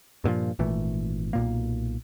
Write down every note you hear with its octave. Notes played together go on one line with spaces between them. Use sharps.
G2 A#2 D3 F3
G#1 A#2 E3 A3
B1 A#2 A#3